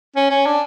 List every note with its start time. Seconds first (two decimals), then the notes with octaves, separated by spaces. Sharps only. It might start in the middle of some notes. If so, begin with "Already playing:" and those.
0.16 C#4
0.30 C#4
0.46 D4